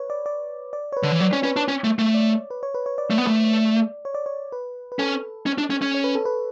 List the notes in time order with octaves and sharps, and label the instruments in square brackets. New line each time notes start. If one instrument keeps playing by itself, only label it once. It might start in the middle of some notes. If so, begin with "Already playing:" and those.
Already playing: [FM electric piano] B4 C#5
D5
D5
D5
C#5
B4
[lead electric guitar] D3
E3
[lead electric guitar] F#3 [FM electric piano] D5
[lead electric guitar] C#4 [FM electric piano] C#5
[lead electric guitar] C#4 [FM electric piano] B4
[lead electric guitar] D4 [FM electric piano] C#5
[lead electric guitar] C#4
A3
A3
[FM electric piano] D5
B4
C#5
B4
C#5
D5
[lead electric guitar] A3
B3
A3
[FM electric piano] C#5
D5
C#5
B4
B4
[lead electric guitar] C#4 [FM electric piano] A4
[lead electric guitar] C#4
D4
C#4
C#4
[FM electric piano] C#5
B4
A4
B4